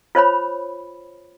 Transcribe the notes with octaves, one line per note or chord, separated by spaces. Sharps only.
F4 C5 C#5 B5